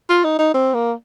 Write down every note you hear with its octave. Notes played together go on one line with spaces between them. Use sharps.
F4
D#4
D#4
C4
A#3